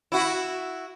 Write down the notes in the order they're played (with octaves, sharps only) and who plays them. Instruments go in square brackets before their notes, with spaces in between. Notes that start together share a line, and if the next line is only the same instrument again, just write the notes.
[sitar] E4 F#4